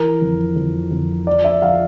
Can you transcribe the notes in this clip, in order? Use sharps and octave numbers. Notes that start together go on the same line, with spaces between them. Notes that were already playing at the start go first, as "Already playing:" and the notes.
Already playing: E3 A#4
F2
F2
F2
F3 D5
E5
F3 F5